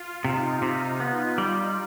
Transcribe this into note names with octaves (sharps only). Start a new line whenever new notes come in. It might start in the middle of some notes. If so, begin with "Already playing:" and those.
Already playing: F4
C3 D#4
C3
B3
G3